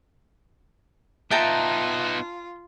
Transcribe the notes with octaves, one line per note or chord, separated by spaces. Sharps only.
B3 D#4 F4 E5 G5 A5 A#5